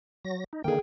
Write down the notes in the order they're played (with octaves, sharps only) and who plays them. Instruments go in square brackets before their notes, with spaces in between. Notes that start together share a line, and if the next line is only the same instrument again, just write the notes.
[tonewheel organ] F#3 A#6
D#4
[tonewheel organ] D3 D#3 A#3 [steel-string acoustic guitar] G#4 G5